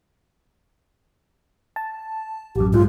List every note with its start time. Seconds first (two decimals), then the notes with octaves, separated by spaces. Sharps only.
1.76 A5
2.56 A1 F#2 G4
2.73 A#1 G#2 F4